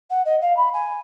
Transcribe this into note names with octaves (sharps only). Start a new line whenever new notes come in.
F#5
D#5
F5
B5
G#5